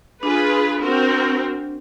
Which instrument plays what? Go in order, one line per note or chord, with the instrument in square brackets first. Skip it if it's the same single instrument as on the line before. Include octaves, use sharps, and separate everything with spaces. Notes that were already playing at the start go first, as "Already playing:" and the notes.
[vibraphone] D4 [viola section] F4 G#4 B4
[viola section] C4 F#4 A#4